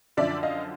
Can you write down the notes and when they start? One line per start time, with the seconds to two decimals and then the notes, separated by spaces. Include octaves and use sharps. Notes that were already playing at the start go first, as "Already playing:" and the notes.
0.17 F#2 D3 F3 D5 E5
0.43 D#5 F5